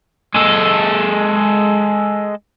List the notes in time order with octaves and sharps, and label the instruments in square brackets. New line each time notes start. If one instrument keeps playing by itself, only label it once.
[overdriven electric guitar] G#3 A4